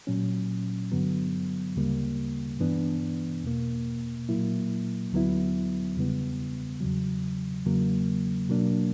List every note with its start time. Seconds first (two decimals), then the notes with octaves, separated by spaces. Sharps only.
0.07 A#2 F#3 C#4
0.92 G2 D3 F#3 B3
1.76 D2 C#3 G3 A#3
2.60 G2 E3 B3 D4
3.44 E2 B2 A#3
4.29 A#2 F#3 A#3 E4
5.12 D2 D3 F#3 B3 E4
5.97 E2 C#3 G3 B3
6.81 E2 C#3 F#3
7.65 E2 C#3 F#3 A#3
8.49 B2 F#3 A#3 D4